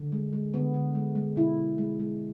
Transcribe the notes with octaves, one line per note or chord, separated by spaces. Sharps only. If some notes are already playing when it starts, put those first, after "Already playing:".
Already playing: D3
G#3
G#3
D3 B3
D3
G#3
G#3
B2 E4
B2
G#3
G#3